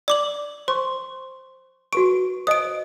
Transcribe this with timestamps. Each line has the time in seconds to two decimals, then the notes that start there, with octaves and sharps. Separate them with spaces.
0.08 D5 D6 F#7
0.68 C5 C6 C#6
1.93 F#4 B4 C#6 D7
2.47 C5 D#5 D#6 D7